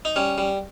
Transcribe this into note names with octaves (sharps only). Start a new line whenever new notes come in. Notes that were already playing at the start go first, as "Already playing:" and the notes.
D#4
G3 C#4
G3